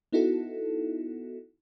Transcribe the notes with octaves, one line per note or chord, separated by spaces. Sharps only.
B3 D#4 E4 F#4 A4